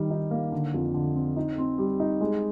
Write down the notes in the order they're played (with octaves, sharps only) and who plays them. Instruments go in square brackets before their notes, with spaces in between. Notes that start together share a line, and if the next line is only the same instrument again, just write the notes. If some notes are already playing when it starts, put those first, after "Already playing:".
Already playing: [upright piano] D#3 G3
D#4
A#3
D3
F2
D3
C4
D#4
C4
G3
D#4
G#3